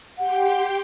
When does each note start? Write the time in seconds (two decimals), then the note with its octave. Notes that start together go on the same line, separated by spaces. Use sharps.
0.18 G4 F#5 G5 C6